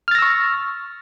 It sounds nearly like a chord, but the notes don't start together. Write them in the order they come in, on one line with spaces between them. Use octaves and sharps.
F6 A6 A#6 E6 C#6